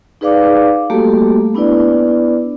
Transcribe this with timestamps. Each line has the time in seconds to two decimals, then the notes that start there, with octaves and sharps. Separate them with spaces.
0.21 D#4 G#4 B4 D5 F5 D6
0.90 G3 A3 A#3 F#4 G4 A4
1.55 B3 D4 E4 B4 D5